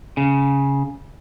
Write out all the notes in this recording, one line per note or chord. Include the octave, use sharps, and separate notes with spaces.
C#3